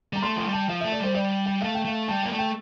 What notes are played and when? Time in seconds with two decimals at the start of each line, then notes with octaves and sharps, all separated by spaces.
0.13 G3 A#5
0.23 A3 C6
0.36 F3 C6
0.46 G3
0.53 A5
0.69 F3 F5
0.81 E5
0.84 A3
0.92 D5
1.00 G3 C5
1.15 G3 D5
1.46 G5
1.61 A3 F5
1.75 G5
1.85 A3 F5
2.08 G3 A5
2.23 A#3 G5
2.31 A3
2.39 G5